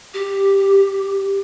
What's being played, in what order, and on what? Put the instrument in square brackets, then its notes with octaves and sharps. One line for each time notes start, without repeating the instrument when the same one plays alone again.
[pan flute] G4